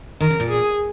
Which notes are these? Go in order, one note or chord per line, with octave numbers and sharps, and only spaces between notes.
D#3 A#4
C#3
A#2
G#4